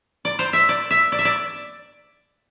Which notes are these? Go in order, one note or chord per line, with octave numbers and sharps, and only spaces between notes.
D5
C5
E5
D5
E5
D5
E5
D5